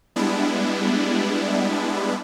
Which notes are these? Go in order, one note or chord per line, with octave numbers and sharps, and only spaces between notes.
G3 G#3 B3 D4 E4